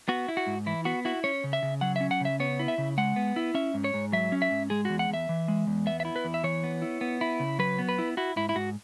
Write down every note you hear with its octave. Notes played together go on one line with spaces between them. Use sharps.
B3 F#4
E4
F#4
G#2
E3 E4
B3 F#4
E4 F#4
C#4 C#5
C#3
E5
C#3
F#3 F#5
C#4 E5
F#5
C#3 E5
B3 C#5
E4
E5
C#3
G#3 F#5
B3
E4
C#4 E5
G#2
C#5
G#2
F#3 E5
C#4
E5
G#2
G#3 G#4
E2 F#4
F#5
E2 E5
E3
G#3
E2
B3 E5
E5
E4
B4
E2
E5
E3 C#5
B3
E4
B3
E4
C#3
F#3 B4
B3
B4
E4
E4 F#4
G#2 E4
E4
G#2 F#4